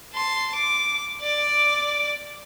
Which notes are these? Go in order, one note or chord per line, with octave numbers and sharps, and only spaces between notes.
A5 C6
D6
D5 D6